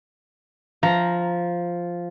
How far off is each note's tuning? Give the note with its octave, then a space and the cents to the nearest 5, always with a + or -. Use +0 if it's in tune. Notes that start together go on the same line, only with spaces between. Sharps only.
F3 +0 A#5 +0